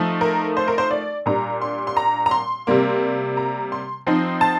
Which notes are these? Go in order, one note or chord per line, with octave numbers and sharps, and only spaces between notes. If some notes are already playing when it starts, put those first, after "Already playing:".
Already playing: F3 A3 D#4
A#4
C5
A#4
C5
D5
A#2 G3 D4 A#5
C6
C6
A#5
A#5
C6
C3 G3 A#3
A#5
C6
F3 C4 D#4
A5